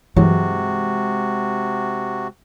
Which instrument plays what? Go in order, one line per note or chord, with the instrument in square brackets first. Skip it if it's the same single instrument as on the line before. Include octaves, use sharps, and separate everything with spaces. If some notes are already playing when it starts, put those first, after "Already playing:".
[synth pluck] G2 E3 F#3 [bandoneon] C3 F#4 [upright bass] G#3